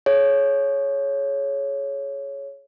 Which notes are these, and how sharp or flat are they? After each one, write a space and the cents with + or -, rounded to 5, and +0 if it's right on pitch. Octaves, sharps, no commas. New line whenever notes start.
G#4 +35 C#5 +0